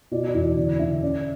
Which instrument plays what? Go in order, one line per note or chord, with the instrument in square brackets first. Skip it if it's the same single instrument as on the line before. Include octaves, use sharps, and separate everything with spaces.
[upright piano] B2 D5
D5
E2
D5
D3 D5
D3 E5
C#4 D5